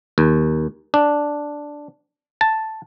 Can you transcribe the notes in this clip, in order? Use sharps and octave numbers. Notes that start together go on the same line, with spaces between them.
D#2
D4
A5